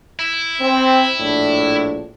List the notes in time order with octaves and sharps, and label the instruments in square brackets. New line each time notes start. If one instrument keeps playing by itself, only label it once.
[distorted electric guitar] E4
[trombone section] C4
A#1 A2 D4